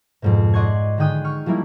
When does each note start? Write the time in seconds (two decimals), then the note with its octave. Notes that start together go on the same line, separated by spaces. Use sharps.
0.22 F2 G#2 B2
0.54 D5 D#5 F#5 C6 C#6 G#6
0.97 D3 D#3 G#4 G5 D#6 F#6
1.24 C#6 F6
1.46 F3 G3 A#3 E4